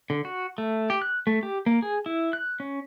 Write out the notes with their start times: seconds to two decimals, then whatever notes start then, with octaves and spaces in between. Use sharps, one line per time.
0.10 D3
0.25 F#4
0.58 A3
0.90 G4
1.02 F#6
1.27 A3
1.43 G4
1.66 A#3
1.82 G#4
2.06 E4
2.33 F#6
2.60 C#4